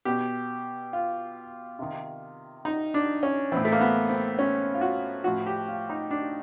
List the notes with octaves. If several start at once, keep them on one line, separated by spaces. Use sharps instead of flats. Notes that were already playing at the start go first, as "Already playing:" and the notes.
B2 G4
F4
C3 D#3
D#4
D4
C#4
A2 E3 C4
A3
A#3
B3
C4
C#4
F4
F#4
A2 F3 F#4
G4
F4
D#4
D4